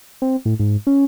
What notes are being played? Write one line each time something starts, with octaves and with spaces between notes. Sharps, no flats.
C4
A2
G#2
C#4